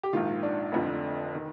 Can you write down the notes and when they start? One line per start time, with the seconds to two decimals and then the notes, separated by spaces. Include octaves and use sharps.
0.03 G4
0.13 A#1 G#2 D#3 F4
0.43 D4
0.72 F1 F2 D3 F3
1.35 D#3